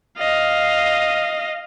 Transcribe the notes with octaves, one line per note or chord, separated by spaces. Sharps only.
D#5 F5